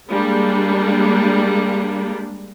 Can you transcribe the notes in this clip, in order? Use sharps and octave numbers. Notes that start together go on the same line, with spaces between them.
G3 G#3 A#3 D4